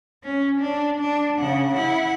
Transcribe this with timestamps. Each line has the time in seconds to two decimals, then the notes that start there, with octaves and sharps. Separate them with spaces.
0.23 C#4
0.60 D4
0.99 D4
1.39 C#3 F#5
1.73 E4 F#5